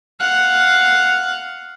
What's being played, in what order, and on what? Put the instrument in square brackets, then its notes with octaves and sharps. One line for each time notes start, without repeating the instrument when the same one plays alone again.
[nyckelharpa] F5 F#5